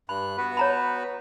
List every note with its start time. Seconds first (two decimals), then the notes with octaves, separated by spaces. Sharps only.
0.09 G2 B5 F#6
0.38 B3 F#4 B4
0.57 C#5 A#5 B5